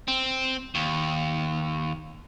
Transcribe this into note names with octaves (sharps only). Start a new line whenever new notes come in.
C4
D#2